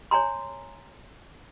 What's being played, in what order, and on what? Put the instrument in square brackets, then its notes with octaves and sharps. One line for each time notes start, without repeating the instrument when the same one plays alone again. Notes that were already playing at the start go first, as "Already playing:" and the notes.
[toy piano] C#5 G#5 A#5 C6